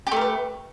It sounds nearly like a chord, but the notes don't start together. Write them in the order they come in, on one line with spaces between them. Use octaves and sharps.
G4 A3 A#4 B4